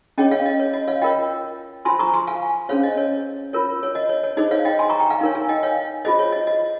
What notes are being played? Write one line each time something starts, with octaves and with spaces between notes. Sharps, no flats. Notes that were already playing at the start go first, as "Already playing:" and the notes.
C#4 G#4 C#5 D#5 G5
C#5 F5
D#5
C#5
D#5
C#5 F5
F4 A#4 C#5 D#5 G5
F4 C5 G#5 C6
A#5 C#6
G#5 C6
F5 G#5
C#4 G#4 C5 C#5 F5
D#5
C#5
F4 A#4 C#5
C#5
D#5
C#5
C#5
D#4 G#4 C5 D#5
C#5 F5
D#5 G5
G#5 C6
A#5 C#6
G5 A#5
F5 G#5
D#4 A#4 C#5
F5 G#5
D#5 G5
C#5 F5
F4 G#4 C5 D#5
C#5
D#5
D#5